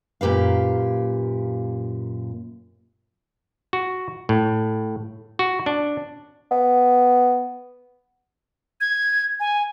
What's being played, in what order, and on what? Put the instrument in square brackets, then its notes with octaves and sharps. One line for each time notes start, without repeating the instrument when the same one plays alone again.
[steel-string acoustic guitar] F#2 A#2 G4 B4 F5
[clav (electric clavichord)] F#4
A2
F#4
D4
[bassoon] B3
[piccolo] G#6
G#5